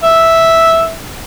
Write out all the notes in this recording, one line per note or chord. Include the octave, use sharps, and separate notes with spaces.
E5